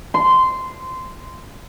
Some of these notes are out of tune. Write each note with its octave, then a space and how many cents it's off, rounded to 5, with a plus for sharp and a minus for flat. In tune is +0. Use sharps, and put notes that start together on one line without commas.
C6 -15